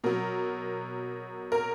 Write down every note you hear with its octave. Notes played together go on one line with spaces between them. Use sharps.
B2 F#3 A#4
A#4